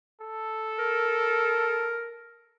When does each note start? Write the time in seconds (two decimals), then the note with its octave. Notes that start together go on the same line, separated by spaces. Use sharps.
0.21 A4
0.79 A#4